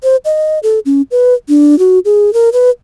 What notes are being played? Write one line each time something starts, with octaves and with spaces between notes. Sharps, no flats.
C5
D#5
A4
C#4
B4
D4
F#4
G#4
A#4
B4